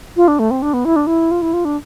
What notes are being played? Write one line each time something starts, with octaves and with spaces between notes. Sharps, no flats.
F4
D4
A3
C4
D4
B3
E4
D4
E4
F4
E4
F4
D4